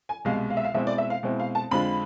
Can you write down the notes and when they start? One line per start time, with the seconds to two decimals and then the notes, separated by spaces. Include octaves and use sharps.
0.09 G#5
0.25 C2 B2 G#3 F5
0.50 F5
0.57 E5
0.64 F5
0.74 B2 G#3 C4 E4 E5
0.87 D5
0.98 E5
1.10 F5
1.23 B2 G#3 C4 E4
1.40 F5
1.55 A5
1.71 F2 D3 G#3 C4 F4 B5